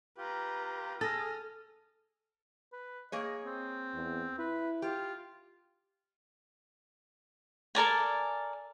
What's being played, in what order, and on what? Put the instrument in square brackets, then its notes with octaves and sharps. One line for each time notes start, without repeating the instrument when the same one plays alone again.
[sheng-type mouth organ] F4 G4 [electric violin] B4 A#5
[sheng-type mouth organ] G#4 [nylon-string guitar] A4 [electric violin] D#6 F6 [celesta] A6 A#6
[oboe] B4
[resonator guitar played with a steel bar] A#3 G#4 C#5 [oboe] D#5
[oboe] C4
[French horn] E2
[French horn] E4 [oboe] B4
[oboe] F4 [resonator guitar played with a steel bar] G4
[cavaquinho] A4 A#4 D5 G#5